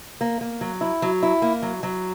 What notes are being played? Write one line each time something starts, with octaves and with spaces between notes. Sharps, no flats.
A#3
A#3
F#3
E4
F#3
E4
A#3
F#3
F#3